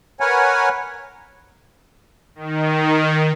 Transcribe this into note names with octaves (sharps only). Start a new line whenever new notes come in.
A#4 B4 C#5 F#5 G#5
D#3